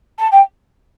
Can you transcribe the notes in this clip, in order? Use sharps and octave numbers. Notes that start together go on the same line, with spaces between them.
A5
G5